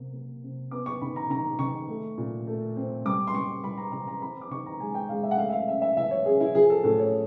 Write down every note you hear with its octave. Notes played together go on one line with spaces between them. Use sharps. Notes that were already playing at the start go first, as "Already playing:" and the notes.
Already playing: C3 A#3
A#3
C3
B3 D6
C#6
D#3 B5
A#5
D#3 A#5
D#3 C#6
A3
A#2
A3
C4
G3 D6
C6
G3 C#6
G3 B5
A#5
E3 A#5
A#5
C4 B5
D6
D#3 C#6
A#5
G#3 G#5
G5
G#3 F5
E5
F#5
A3 F5
E5
F5
C#4 E5
E5
E3 E5
C#5
C#4 G#4
E4
F3 G#4
A4
A2 A4
C#5